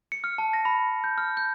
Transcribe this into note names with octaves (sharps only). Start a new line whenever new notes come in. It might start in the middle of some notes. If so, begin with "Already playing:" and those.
C#7
F6
A5
A#6
B5
G6
F6
G6